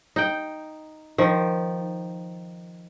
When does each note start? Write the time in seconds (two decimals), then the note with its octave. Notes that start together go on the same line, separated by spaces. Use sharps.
0.16 D#4 G5
1.18 D#3 F3